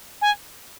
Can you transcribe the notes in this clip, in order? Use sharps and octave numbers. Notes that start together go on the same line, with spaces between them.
G#5